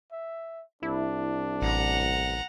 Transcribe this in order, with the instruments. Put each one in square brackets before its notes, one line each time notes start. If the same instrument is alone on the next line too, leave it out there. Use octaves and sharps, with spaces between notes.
[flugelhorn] E5
[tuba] C2 [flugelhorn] D4 [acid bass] E4
[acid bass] A1 [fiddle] F#5 A#5